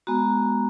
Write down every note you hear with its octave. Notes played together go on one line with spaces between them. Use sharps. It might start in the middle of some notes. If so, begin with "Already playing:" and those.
G#3 B3 F#4 A#5